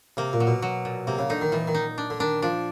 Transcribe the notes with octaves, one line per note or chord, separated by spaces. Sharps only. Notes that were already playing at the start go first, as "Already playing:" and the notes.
C3 A#3
A#2
F#3
B2
F#3
A#2
C3 A#3
C#3
D3 D#4
D#3
A#2 E3
D#3
D#4
D4
D3
D#3 D4
F3 D4